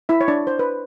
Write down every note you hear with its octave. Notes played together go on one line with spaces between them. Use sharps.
E4 E5
C#5
D4 D5
C5
B4